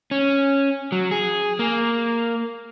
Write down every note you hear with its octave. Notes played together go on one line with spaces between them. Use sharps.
C#4
F#3
G#4
A#3